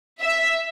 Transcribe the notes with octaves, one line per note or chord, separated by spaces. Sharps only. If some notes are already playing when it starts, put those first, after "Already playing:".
E5